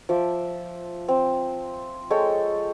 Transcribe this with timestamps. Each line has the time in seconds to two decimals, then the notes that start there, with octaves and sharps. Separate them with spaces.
0.09 F3 E5 D6
1.08 C4
2.10 G#3 A4 C#5 G5